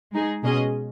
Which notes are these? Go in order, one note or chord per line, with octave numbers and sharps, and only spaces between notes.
G#3 D#4 G#4
B2 G#3 C#4 G#4 D#5